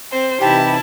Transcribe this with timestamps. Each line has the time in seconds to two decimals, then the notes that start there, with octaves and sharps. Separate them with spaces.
0.10 C4 C5
0.41 C3 E3 D#4 E4 G4 A5